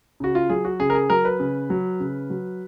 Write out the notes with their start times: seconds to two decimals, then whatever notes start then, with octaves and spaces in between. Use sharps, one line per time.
0.20 C#3 F#4
0.35 F4
0.50 F#3 G#4
0.65 F#4
0.80 C#3 G#4
0.90 A#4
0.95 G#4
1.10 F#3 A#4
1.25 B4
1.40 C#3
1.70 F#3
2.00 C#3
2.30 F#3